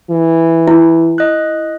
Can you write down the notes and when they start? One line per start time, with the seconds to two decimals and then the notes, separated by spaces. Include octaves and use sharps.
0.11 E3
0.68 E4
1.18 D#5 F#6